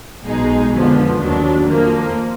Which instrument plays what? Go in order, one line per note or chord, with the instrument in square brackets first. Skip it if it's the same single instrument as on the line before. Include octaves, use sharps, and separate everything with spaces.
[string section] B1 B2 G#3 D#4 G#4
F2 D3 F3 B3
D#2 D#3 F#3 D4
F2 F3 A#3